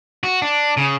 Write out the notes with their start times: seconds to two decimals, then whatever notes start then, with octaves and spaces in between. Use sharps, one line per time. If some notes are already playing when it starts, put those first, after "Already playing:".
0.23 F#4
0.42 D4
0.77 C#3